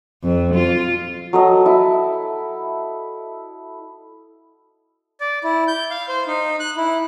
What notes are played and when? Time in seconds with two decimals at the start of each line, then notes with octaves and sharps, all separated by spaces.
0.24 F2
0.55 F4
1.33 F#3 A4 D#5
1.66 E4
5.20 D5
5.44 E4
5.68 G6
5.91 F5
6.09 C5
6.27 D#4
6.60 F#6
6.77 E4